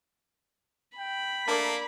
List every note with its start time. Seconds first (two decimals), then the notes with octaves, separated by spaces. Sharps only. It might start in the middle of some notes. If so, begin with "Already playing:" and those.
0.98 G5 B5
1.48 A3 A#3 D4 A#4 D5